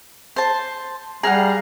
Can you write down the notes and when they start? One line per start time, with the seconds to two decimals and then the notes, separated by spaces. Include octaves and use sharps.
0.36 C5 A5
1.23 G3 G#4 F5 F#5 A#5